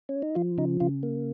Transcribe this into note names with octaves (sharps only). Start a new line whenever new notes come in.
C#4
D#4
F3 F4
C#3 D#4
C#3 F4
A#3